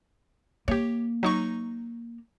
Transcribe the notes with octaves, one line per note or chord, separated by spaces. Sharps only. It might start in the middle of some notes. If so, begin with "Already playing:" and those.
A#3 G4 C#5
F#3 D#4 C#6